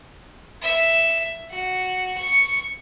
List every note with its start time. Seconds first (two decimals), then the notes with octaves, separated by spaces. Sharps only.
0.62 E5
1.51 F#4
2.17 C#6